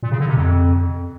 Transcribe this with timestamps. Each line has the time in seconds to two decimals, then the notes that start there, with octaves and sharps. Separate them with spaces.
0.03 A#2
0.11 C#3
0.20 D3
0.28 C3
0.37 F2